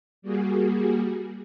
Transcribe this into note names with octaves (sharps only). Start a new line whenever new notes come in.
G3 A#3 F#4 G#4